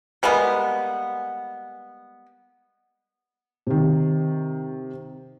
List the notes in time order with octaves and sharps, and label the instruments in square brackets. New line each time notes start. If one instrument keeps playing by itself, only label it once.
[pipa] G3 G#3 A#3 B3
[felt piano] C3 D#3